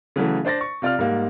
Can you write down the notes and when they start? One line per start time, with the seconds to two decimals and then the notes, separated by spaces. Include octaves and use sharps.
0.16 C#3 E3 F#3 A3
0.45 D4 C5 D5 A6 A#6
0.61 C#6
0.82 C3 F4 D5 F5 F6
0.99 G#2 G3 A#3